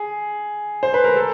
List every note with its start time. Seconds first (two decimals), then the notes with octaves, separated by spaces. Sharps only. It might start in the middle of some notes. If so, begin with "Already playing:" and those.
Already playing: G#4
0.83 C5
0.94 B4
1.04 A#4
1.16 A4